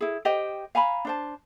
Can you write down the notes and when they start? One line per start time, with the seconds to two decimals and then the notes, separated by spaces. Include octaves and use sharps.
0.01 E4 G#4
0.25 G4 C5 D#5 G5
0.75 F5 G#5 A#5 B5
1.05 D4 C5 A5